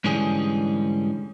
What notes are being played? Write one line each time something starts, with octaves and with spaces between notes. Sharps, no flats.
G#2 D3 E3 G3 C#4 G#4